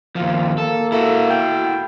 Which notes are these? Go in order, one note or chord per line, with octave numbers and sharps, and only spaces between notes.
D#2 F3 F4
A#3 A4
E4 F#4 A4
G5